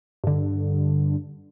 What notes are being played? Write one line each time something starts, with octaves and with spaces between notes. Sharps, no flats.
G2 D3